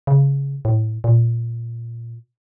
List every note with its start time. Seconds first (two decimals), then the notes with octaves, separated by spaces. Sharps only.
0.07 C#3
0.65 A2
1.04 A#2